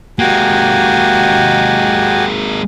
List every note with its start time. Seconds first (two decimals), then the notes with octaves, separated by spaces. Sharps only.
0.19 G#3 A#3 F#4 G4 G#5